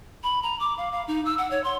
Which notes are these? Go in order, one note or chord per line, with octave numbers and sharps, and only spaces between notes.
B5
A#5
D6
F5
F5
D#4
E6
F#5
C#5
C6